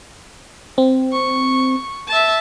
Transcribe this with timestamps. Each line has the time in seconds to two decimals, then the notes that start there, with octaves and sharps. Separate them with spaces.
0.78 C4
1.12 C#6
2.08 E5 A5